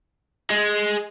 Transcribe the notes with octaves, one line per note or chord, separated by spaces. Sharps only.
G#3